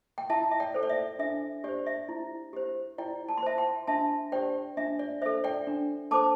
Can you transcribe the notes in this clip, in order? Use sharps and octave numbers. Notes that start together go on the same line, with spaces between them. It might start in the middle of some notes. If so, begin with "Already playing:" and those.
G5
E4 E5 A5
E5
D5 G5
A4 C5
D5
E5
D4 E5
G4 C5 D5
E5
E4
G4 C5
E4 D5 G5
A5
C6
C5 E5 A5
G5 C6
D4 E5 A5
G4 C5 D5 G5
D4 E5
D5
A4 C5 E5
D5 G5
D4
A4 C5 A5 D6